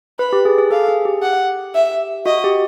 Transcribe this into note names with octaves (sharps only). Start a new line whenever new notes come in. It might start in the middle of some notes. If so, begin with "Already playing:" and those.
B4 B5
G4
G#4
G#4
A4 F5
G#4
G4
F#5
E5
F#4 D#5
G4